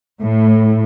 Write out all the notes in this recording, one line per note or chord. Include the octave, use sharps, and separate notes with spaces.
A2